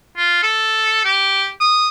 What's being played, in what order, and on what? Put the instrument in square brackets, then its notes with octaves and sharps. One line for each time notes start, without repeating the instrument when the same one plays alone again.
[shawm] F4
A4
G4
D#6